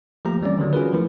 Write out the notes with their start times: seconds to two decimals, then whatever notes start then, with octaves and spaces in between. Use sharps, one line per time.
0.25 F3 A3 A#3 G4 A#5
0.42 E3 G3 C4 C#4 D5
0.58 D3 D#3 F#3
0.73 C#4 F4 F#4 G#4 A#4 B4
0.93 D#3 F3 A3 E4